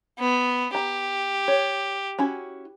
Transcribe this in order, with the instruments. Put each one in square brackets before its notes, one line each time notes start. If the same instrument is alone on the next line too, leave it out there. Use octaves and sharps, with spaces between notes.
[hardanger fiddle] B3
[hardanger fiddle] G4 [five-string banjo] A#5
[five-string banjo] C#5
C#4 E4 F#4